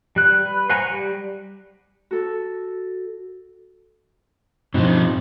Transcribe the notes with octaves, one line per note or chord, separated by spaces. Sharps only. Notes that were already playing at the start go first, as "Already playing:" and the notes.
G3 F#6
B4
C5 F#5 G#5 A#5 C#6
G3
F#4 A4
G2 B2 F3 C4 D#4